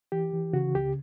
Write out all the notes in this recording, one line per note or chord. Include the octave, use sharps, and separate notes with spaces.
E3 G4
E3
C#3 F#4
C#2 G4